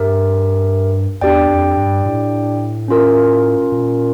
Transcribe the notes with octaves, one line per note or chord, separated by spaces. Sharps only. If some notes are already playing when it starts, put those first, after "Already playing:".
Already playing: G2 G4 A#4 E5
E2 D4 G4 D5 G5
F2
G2
A2
C#4 F4 A#4
A#2